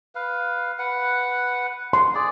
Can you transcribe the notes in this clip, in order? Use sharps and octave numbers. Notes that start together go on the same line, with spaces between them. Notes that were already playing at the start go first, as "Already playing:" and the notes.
B4 F5
B4 F#5
C6
G#4 D5